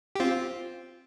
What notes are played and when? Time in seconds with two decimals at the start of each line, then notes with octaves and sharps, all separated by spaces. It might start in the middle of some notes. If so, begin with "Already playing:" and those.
0.16 G4
0.20 C4 F4